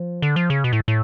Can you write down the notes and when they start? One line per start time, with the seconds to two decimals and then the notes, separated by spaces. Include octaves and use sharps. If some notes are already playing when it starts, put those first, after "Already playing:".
Already playing: F3
0.22 D3
0.36 F3
0.50 C#3
0.64 B2
0.73 A2
0.88 A2